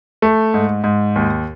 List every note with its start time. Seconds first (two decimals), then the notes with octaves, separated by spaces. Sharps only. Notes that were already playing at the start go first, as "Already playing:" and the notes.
0.22 A3
0.54 G#2
0.84 G#2
1.16 D#2